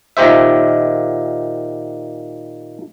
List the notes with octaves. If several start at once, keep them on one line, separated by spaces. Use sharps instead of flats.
A#2 D#3 G4 C5 E5